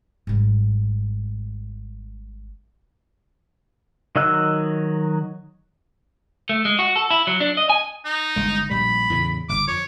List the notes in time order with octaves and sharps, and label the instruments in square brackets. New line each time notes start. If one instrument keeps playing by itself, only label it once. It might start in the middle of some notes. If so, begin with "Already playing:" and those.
[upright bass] G#1 G3
[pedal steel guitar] D#3 F#3 D#5 E6 F#6
[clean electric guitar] A3
G#3
F#4
A4
E4
F#3
D4
D#5
G#5
[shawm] D#4
[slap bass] G1 G#3
[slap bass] A#1 G3 [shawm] B5
[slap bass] E2 A2 C#3
[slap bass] G1 [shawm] D6
[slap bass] F2 [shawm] C#5